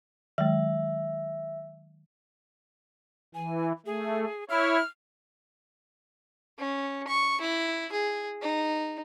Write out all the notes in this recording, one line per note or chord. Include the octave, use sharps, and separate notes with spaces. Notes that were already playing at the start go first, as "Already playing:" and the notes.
D#3 F#3 G#3 E5
E3 G#5
A3 G#4
E4 C#5 F6
C#4
C#6
E4
G#4
D#4